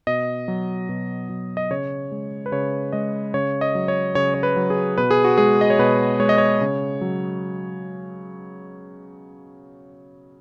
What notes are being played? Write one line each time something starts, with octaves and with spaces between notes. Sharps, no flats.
B2 D#5
F#3
B2
F#3
D#5
C#3 C#5
G#3
B4
C#3 C#5
G#3 D#5
C#3 C#5
D#5
F#3
C#5
C#3 C#5
C#5
B4
F#3
G#4
B2 B4
G#4
F#4
G#3 G#4
D#5
C#5
B2 B4
G#3 C#5
D#5
C#5
C#3
F#3